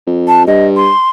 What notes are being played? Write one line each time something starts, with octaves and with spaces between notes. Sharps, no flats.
F2
A5
G2 D#5
C6